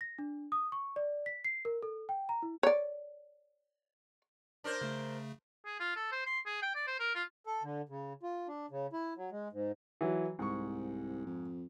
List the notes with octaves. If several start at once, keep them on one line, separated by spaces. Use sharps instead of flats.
A#6
D4
D#6
C#6
D5
B6
C7
A#4
A4
G5
A#5
E4
C#5 D5
D4 A#4 C5
C#3 A3
G#4
F4
A4
C5
C6
G#4
G5
D5
C5
A#4
F4
A4
D3
C#3
F4
D4
C#3
E4
F#3
G#3
G#2
E3 F#3
C2 G#2 C#6
F2